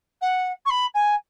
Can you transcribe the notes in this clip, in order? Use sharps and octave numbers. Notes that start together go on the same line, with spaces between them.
F#5
C#6
B5
G#5